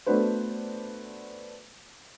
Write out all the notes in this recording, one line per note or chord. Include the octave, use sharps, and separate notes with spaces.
A3 B3 D4 F#4 B4 C5